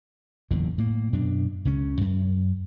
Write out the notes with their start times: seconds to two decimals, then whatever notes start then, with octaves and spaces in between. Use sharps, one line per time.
0.51 F#1 E2 A#2 D3
0.78 A2 A#3
1.13 F#2 B2 D4
1.65 C#2 C#3 C#4
2.01 F#2